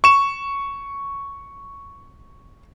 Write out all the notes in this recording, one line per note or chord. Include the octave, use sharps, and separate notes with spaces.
C#6 E7